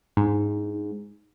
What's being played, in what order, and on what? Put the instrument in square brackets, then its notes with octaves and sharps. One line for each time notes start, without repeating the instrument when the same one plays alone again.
[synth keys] G#2